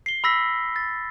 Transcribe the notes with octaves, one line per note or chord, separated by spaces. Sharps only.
C7 G7
B5 E6 A#6 B6
A6